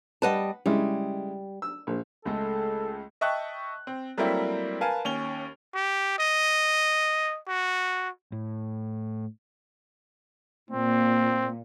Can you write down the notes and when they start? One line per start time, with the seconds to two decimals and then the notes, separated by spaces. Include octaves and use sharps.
0.22 G3 B4 D#5 F#5 A5
0.66 C#3 G3 G#3 E4
1.62 E6
1.87 A#1
2.25 C#2 G#3 A3 A4
3.21 D#5 E5 G5 A5 C#6 F#6
3.87 C4
4.17 F#3 G3 A3 A#3 C4 E4
4.81 A#4 B4 F5 G#5 A5
5.05 D#2 C#4 F7 G7
5.75 G4
6.19 D#5
7.48 F#4
8.32 A2
10.71 A#2 C4